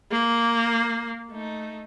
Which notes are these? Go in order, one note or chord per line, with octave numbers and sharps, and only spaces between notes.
A#3
A3 D#4